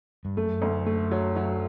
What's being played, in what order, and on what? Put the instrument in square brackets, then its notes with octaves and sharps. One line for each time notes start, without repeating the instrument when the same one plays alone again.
[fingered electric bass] G2
[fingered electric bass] F#2 [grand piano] A3
[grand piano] D2
A3
F#3
F#3